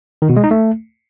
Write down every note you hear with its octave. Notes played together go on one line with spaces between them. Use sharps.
D#3
B2
G#3
D#4
A3